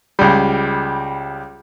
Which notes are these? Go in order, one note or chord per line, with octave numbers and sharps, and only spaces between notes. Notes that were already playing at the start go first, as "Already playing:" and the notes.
C#2 G3